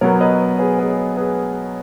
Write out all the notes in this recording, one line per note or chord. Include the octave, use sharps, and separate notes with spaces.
B2 F#3 B3 A#4 C#5
B4 D#5
G#4 B4
G#4 B4
G#4 B4